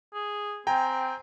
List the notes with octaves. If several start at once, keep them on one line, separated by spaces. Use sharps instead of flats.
G#4
C4 G5 G#5 A#5